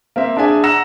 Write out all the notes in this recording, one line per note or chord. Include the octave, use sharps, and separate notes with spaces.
A#3 C4 E5
D4 G#4 E5 G#5
F#5 A#5 E6 A#6 E7